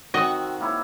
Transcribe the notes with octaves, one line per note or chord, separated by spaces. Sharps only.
D#3 C4 F#4 D#5
A#3 E4 C#5